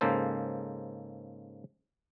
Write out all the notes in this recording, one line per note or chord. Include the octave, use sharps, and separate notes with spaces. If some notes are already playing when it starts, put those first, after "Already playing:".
G#2 C#3 A#3 A4 C5